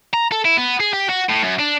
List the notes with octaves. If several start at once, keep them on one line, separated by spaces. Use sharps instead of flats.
A#5
A4
E4
B3
G#4
G4
F#4
A2
F#2
D4